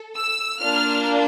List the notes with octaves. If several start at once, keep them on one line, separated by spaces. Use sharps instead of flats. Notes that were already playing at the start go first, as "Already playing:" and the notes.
Already playing: A4
E6
A#3 D4 F4 F6